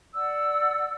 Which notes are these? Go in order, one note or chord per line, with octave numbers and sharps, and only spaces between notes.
D5 F#5 E6